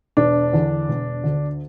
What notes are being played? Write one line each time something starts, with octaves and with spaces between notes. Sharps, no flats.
E1 D4
E2 D3
E1
D2 D3